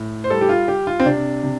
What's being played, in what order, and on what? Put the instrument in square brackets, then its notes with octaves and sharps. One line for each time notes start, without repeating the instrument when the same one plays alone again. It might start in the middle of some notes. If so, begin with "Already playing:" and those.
Already playing: [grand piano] A2
C5
G3 A4
G4
F4
G3 G4
F4
C4
C3 D4
C3